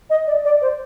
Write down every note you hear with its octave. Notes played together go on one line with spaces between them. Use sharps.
D#5
D5
D5
C5